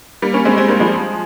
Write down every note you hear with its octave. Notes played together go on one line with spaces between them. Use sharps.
G3 A#3
A#3 C#4
G#3 C4
G#3 C4
G3 A#3
F3 G#3